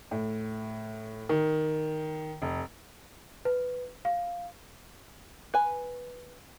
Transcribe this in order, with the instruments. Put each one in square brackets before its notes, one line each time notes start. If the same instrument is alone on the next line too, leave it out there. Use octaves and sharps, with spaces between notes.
[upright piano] A2
D#3
F1
[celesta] B4
F5
[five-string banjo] B4 G#5